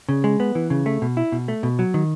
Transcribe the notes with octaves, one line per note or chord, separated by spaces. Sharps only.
C#3
G#3
B3
E3
C#3
A3
B2
E4
B2
A3
B2
F#3
D#3